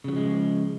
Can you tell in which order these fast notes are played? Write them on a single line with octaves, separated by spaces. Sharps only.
C#3 F#3 F3 G#3